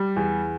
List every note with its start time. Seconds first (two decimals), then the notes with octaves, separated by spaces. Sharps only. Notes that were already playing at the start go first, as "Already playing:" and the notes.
Already playing: G3
0.16 E2